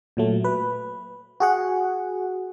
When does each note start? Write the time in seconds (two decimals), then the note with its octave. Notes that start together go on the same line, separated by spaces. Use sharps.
0.17 A#2 F#3 A3
0.44 B4
1.40 F#4 G#4 F#5